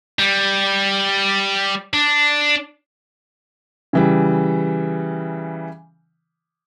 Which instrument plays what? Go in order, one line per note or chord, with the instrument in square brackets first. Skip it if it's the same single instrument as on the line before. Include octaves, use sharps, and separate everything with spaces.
[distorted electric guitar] G3
D4
[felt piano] C#3 E3 G3